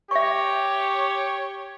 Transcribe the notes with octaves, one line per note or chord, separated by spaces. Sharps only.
G4 C#5 E5 C#6